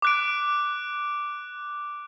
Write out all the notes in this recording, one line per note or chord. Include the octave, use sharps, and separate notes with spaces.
D6 F#6 D7